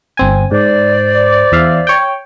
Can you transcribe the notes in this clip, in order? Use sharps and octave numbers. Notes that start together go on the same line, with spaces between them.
G1 C4 G#5
G#2 C5 D5
E2 E5 F5
C#5 G5